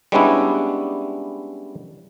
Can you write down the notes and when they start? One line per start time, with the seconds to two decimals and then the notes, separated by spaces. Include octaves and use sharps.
0.12 G3 G#3 B3 C#4 D4 E4